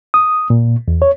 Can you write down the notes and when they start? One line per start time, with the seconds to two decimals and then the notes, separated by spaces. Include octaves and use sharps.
0.14 D#6
0.50 A#2
0.88 E2
1.02 C#5